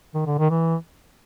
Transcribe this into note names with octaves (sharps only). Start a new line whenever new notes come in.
D#3
D3
D#3
E3